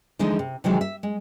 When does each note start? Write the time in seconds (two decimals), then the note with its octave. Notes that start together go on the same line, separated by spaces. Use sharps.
0.19 D3 E3 F3 G#3 D4 D#4
0.39 C3
0.64 C3 D#3 E3 F#3 G#3
0.81 E5
1.03 G#3